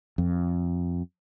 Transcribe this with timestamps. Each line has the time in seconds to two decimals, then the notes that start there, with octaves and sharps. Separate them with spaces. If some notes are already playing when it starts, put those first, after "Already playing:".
0.18 F2